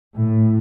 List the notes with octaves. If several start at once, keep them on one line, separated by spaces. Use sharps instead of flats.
A2